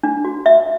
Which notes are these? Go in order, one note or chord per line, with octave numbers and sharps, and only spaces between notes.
D4
F#4
E5